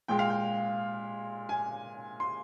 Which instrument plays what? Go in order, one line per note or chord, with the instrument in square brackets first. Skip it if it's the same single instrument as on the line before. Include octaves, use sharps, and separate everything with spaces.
[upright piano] A#2 G#3 G5
F5
G5
G#5
C6